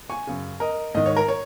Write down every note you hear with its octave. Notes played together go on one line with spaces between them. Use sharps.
G#5 C#6
F#2 C#3
A#4 D#5
G#2 D#3 D#5
C#5
A#4
C#5